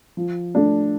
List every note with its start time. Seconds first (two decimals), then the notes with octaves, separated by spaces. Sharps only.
0.17 F3
0.55 A3 D4